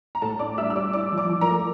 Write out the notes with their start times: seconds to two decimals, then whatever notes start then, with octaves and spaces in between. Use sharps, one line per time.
0.15 A#5
0.22 A2 A4 A5
0.39 D4 D5 D6
0.58 G3 E5 E6
0.70 E6
0.76 G3 D5 D6
0.93 E4 D5 D6
1.12 F3
1.18 D5 D6
1.29 F3
1.41 A#4 A#5
1.48 A3